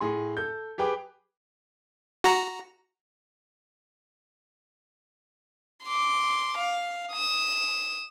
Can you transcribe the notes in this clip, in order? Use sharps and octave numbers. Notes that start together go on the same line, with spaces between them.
A2 G#4 C6
A4 G6
G4 G#4 B4 G5 D6
F#4 A#5
C6 D6
F5
D#6 E7